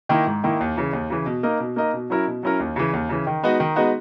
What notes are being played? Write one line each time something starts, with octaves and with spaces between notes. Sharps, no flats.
D#3 A#3 E4
G#2
D#3 A#3 E4
D#2
C#3 E3
D#2
C#3 E3
B2
A#3 D#4 A#4 D#5
B2
A#3 D#4 A#4 D#5
B2
F#3 C#4 E4 A#4
B2
F#3 C#4 E4 A#4
D#2
C#3 E3
D#2
C#3 E3
D#3
G#3 B3 D#4 F#4
D#3
G#3 B3 D#4 F#4